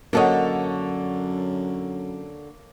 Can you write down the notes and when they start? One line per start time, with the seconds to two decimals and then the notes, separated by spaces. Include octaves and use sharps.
0.13 F#2 D3 A#3 F#4 A4 C#5 D#5